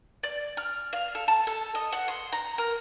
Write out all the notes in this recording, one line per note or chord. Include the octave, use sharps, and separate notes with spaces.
D5
F6
F5
A4
A5
A4
D#5
F#5
C6
A#5
A#4